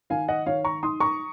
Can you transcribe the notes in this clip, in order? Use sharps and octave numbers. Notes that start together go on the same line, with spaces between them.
D#3 F5 G#5
D#5 F#5
D#3 C#5 F5
A#5 C#6
D#4 C6 D#6
A#5 C#6